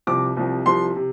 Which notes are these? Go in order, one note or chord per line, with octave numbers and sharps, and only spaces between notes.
C2 C3 F3 C4 D6
C2 C3 F3 C4
C2 C3 F3 C4 C6
C3